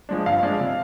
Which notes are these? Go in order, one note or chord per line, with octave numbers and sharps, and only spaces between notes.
F3 G#3 D4
G2 F5
F3 G#3 D4
C3